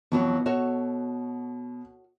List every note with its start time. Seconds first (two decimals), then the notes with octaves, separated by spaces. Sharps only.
0.12 F2 B2 E3 F#3
0.46 F#4 A4 C#5